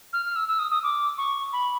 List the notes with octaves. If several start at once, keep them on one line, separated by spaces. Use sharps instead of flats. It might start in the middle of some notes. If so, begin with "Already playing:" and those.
F6
F6
E6
E6
D#6
D#6
D6
C#6
B5